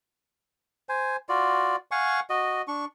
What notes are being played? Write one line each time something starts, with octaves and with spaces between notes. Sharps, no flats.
C5 G#5
F4 F#4 D5
F5 F#5 G#5 C#6
F#4 D#5
D4 C#6